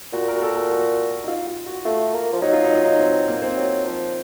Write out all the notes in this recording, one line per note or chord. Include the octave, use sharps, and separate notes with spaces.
A#2 F#4
A#4
F#4
A4
A4
F#4
D#4
F4
F4
F#4
A3 F4
A#3
F3
F#3 D#4
F4
D#4
F4
D#4
C4
A#3
C4
F#3
F3